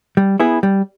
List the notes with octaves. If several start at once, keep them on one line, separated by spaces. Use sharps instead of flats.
G3
B3 E4 G#4
G3